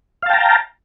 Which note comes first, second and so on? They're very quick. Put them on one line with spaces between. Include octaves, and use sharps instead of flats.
F5 A5 G5 A#5